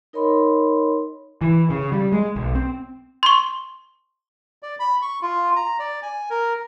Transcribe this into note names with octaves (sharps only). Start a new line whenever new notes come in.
D#4 A#4 C#5 D#5 B5 C6
E3
C#3
G3
G#3
B1
C4
C6 C#6
D5
B5
C#6
F4
A#5
D5
G#5
A#4